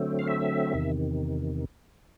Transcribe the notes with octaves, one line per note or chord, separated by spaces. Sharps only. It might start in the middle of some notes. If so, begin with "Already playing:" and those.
Already playing: D3 F#3 A3 C4
F5
E5
E2 C3 D#3